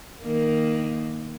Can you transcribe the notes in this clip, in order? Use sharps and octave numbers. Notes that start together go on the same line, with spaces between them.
D#3 A#3